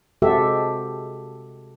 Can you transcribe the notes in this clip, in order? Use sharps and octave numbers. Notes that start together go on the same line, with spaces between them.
C3 G#3 F#4 G4 A4 E5